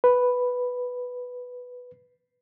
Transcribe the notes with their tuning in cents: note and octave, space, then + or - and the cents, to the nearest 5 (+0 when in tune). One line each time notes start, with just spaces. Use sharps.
B4 +0